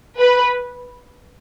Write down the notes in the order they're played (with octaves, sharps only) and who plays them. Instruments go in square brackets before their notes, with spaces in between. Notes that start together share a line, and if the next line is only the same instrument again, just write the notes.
[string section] B4